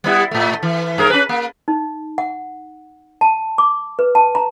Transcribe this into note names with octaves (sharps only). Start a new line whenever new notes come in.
G3 B3 E4
A2 A3
E3
G2 G#4 A#4
C#4 B4
A#3
D#4
F#5
A5
D6
B4
A5
A#5